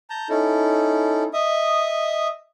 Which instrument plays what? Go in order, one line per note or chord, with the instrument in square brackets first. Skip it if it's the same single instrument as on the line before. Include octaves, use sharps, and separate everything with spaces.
[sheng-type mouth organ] A5 A#5 G6
C#4 D#4 E4 A4
D#5 E5 D#6